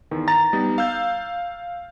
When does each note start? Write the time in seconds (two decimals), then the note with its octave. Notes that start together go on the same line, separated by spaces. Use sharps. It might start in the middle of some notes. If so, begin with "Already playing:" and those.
0.11 E2 D#3
0.28 A#5 A6
0.53 G3 B3 D#4
0.78 F5 E6 G6